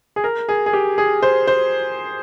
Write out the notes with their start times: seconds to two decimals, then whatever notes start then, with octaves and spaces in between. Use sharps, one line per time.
0.16 G#4
0.24 A#4
0.49 G#4
0.66 G#4
0.73 G4
0.98 G#4
1.23 C5
1.48 C5